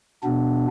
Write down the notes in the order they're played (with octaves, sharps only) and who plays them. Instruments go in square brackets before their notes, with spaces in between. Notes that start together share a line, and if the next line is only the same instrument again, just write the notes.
[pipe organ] B2 B3 D4